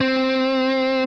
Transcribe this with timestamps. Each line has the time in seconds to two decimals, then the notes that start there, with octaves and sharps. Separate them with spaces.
0.01 C4